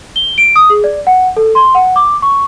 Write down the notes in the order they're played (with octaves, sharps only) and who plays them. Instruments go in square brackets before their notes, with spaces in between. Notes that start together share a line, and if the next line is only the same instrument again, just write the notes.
[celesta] G7
D7
D#6
G#4
D5
F#5
A4
C6
F#5
D6
C#6